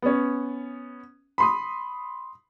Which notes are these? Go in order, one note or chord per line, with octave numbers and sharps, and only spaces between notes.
B3 C#4
B5 C6 D#6